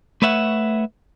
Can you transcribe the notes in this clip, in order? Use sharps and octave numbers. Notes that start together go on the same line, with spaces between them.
A3 B4 C#5 E5 F#5